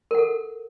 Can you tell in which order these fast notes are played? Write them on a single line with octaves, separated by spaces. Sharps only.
A#4 F#5 A4